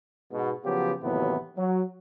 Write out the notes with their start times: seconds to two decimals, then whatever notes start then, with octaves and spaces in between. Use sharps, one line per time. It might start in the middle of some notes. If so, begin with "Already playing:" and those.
0.32 G#2 B2
0.64 C#3 F3 F#3 B3 F4 G4
1.02 D#2 A2 C3 E3 F#3 B3
1.56 F#3